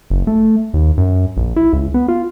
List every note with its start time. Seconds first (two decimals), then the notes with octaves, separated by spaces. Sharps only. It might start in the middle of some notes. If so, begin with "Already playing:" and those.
0.10 F#1
0.27 A3
0.74 D#2
0.97 F#2
1.37 A#1
1.56 E4
1.73 C#2
1.94 B3
2.08 F4